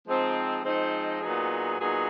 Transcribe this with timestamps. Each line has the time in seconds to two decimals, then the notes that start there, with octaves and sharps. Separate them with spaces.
0.06 F3 G#3 C4 D#4
0.63 F3 G#3 C4 D#4
1.21 A#2 F#3 B3 D#4 G#4
1.78 A#2 F#3 B3 D#4 G#4